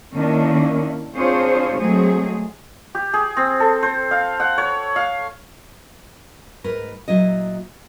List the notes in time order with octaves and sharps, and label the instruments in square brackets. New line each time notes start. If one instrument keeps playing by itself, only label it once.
[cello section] D#3 A#3 C#4 D4 E4
C4 D4 F4 G#4 C5 C#5
F#3 G#3 A3 C4 G#4
[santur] G4
G#4
C4
A4
C5
F5
F#5
C#5
F5
[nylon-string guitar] G#2 A#4 B4
A#2 F#3 E4 D#5